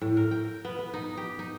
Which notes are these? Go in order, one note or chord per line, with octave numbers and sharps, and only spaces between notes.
A2
A#4
G5
B3
B3
D#4
G4
D#4